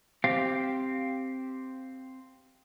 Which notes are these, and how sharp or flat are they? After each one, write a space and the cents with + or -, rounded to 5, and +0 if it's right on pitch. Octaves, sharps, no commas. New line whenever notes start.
C4 +0 G4 -5 F5 +0